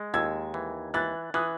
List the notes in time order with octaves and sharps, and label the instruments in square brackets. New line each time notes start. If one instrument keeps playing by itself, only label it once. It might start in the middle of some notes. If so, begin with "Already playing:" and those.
Already playing: [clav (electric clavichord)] G#3
[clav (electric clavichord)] D#2 [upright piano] E6 G#6
[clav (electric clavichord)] E3
[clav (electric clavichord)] E3 [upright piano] F#6 A6
[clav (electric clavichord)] E3 [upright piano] D#6 F#6